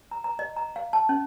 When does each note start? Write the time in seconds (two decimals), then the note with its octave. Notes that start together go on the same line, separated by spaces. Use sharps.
0.11 A#5
0.24 A#5
0.39 D#5
0.57 A#5
0.76 F5
0.93 A5
1.09 C#4